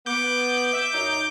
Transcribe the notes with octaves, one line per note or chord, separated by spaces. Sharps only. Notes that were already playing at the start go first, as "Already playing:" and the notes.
B3 D6 G6
E5
F#2 D#4